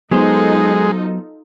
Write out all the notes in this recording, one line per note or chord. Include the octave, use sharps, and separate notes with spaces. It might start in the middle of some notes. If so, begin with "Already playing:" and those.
F#3 G#3 B3 D#4 F4 A4 C5